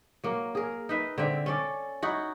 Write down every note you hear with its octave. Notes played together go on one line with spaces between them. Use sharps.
F#3 A#3
G#4 A#4
D#4 B4 E5
D3 C4 E5
C#4 A4 D5
D#4 E4 F#4